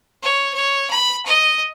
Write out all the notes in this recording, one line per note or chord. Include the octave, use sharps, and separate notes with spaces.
C#5
C#5
B5
D#5